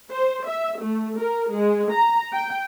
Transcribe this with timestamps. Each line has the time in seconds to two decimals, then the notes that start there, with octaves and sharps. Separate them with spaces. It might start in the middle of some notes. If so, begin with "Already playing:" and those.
0.12 C5
0.49 E5
0.82 A3
1.19 A#4
1.54 G#3
1.94 A#5
2.33 G5